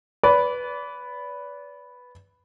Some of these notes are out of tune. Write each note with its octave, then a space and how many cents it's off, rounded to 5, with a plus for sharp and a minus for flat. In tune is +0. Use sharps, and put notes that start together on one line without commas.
B4 +0 D5 -35